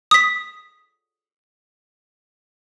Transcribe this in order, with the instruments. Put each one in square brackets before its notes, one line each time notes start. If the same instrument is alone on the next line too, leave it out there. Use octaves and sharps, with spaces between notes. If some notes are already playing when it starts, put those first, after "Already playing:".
[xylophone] D#6 B6